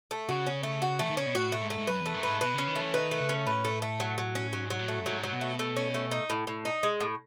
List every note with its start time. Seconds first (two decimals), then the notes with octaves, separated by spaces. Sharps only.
0.11 A3
0.29 C#3 F#4
0.47 C#4
0.63 A3
0.82 F#4
0.99 E3 A3
1.10 D#3
1.17 C#3 C#4
1.26 B2
1.35 A2 F#4
1.52 A3
1.61 G#2
1.70 A3
1.78 G#2
1.87 F#2 B4
2.00 E2
2.06 A3
2.14 F#2
2.23 G#2 B4
2.40 B2 B4
2.54 C#3 C#4
2.67 D#3
2.76 A3
2.81 E3
2.94 D#3 B4
3.11 A3
3.20 C#3
3.29 C#4
3.46 A2 B4
3.65 A3
3.82 A3
4.00 F#3
4.18 F#3
4.35 C#4
4.53 G#2 F#3
4.70 F#3
4.79 A2
4.88 A3
4.99 F#2
5.06 G#2 F#3
5.23 F#3
5.33 B2
5.41 A3
5.59 A3
5.76 C#4
5.94 A3
6.11 D#4
6.30 A2
6.47 A2
6.65 D#4
6.83 G#3
7.00 A2